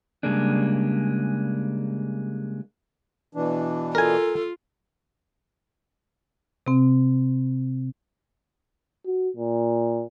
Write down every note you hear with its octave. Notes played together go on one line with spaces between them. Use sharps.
C#3 G3 G#3 A#3 D4
B2 E3 D4
F4 A4 A#4 G#5
C3 C4
F#4
A#2